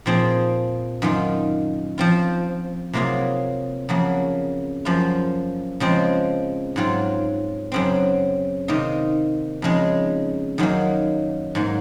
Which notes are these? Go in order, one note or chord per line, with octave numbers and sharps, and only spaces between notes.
A#2 F3 C4 F4 G#4
F#2 D#3 A#3 F4
F3 C4 F4
C3 F#3 A#3 F4 G#4
F2 C#3 F#3 A#3
F#2 F3 A#3 F4
C#3 F3 G#3 C4
G#2 F#3 C4 F4
F#2 C#3 F#3 C4
C3 D#3 A#3 D#4
F2 C#3 G#3 D#4
F#2 D#3 F#3 A#3
G#2 F#3 A#3